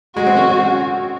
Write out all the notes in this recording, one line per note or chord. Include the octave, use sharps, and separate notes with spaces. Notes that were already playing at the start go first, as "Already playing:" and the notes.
G#3 F#4
C4
C#4